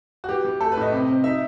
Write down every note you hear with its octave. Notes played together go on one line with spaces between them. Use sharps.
F#4
E3 G4
E3
A3 A4
B4
A2 D#5
C3
C4
D#4 E5